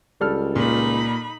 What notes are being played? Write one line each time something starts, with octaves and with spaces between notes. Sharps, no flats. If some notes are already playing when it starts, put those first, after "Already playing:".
C#2 G3 A4 F6
A#2 D#4 B5